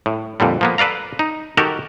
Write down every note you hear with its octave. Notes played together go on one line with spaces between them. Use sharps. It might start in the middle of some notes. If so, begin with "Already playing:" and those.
A2
F2 A#2 D3 G3
F3 A#3 B3
A4 B4 D5 F5 A#5
D#4
D#3 F#4 G4 A4 A#4